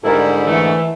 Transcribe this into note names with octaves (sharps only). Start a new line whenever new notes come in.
G#2 D3 G3 E4 A4 A#4
E3 A3